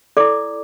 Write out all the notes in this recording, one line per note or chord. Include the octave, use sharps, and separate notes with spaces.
E4 A4 D5 D6